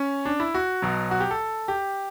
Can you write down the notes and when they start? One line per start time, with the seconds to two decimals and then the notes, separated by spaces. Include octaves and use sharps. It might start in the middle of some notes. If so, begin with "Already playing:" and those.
Already playing: C#4
0.25 D4
0.40 E4
0.54 F#4
0.82 B1 B2 F#3
1.11 F#4
1.20 G4
1.31 A4
1.68 G4